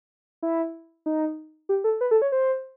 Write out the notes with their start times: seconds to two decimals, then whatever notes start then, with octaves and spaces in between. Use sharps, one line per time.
0.43 E4
1.06 D#4
1.69 G4
1.84 A4
2.01 B4
2.11 A4
2.22 C#5
2.32 C5